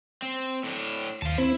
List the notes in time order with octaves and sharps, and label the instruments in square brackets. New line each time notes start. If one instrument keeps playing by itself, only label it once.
[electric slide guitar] C4
A2 D4
[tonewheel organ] D#2 [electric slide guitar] F5 A5
[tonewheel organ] C4 [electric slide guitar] E4